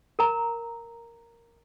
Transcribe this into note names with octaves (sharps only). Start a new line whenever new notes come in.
A#4 A#5